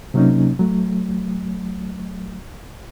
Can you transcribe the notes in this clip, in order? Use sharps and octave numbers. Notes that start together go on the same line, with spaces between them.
C3 F#3 A#3 C#4 D#4
F#3 A3